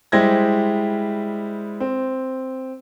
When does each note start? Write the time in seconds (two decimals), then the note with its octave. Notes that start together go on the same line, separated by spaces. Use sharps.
0.12 G3 G#3 E4 C5 G#6 A#6
1.80 C4